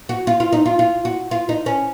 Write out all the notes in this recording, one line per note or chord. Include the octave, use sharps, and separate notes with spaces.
F#4
F4
F4
D#4
F4
F4
F#4
F4
D#4
C#4